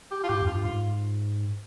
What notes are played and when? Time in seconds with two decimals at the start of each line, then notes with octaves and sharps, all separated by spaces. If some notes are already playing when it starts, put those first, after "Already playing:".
0.11 G4
0.23 F4
0.29 G#2 G4
0.42 F2
0.47 G2 F4
0.64 G#2 F4